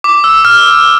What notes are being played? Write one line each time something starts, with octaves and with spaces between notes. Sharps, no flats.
D6
E6
F6